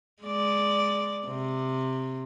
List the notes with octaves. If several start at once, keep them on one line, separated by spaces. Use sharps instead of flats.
G#3 D5
C3